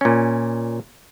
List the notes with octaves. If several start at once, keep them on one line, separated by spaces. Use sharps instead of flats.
A#2 C#4